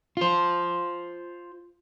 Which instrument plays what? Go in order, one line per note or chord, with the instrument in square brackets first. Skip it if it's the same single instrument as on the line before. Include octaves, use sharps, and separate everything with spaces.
[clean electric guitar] F4 C5